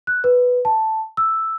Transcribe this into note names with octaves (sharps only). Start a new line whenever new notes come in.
F#6
B4
A5
E6